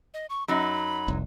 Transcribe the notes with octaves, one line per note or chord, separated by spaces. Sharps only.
D#5
C#6
F#2 F#3 D#4 B5
F1 C2